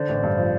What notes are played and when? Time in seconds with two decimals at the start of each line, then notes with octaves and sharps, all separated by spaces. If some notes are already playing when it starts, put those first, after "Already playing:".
Already playing: D3 C5 D5
0.09 A1
0.23 G2
0.38 F3